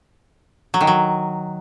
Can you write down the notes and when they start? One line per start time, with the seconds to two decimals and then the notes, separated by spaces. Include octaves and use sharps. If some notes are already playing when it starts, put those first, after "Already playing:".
0.74 F#3
0.81 D#3
0.87 F#3